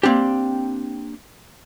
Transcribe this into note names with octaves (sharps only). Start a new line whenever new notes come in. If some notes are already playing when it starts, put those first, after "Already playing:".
A#3 C4 D4 G4